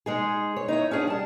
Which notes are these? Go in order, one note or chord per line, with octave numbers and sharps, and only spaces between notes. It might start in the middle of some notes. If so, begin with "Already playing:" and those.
G#3 D#4 G#4
C#5
D#4 E4 C#5
C#4 D4 G#4 C#5 F#5
G3 A5